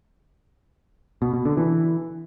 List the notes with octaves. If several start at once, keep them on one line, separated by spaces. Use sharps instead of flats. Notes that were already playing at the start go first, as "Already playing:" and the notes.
B2
B2
D3
E3